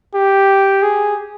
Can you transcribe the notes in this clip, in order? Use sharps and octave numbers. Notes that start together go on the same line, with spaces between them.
G4
G#4